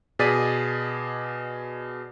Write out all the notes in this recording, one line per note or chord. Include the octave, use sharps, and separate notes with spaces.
B2 G#4 D5 A6 B6 D#7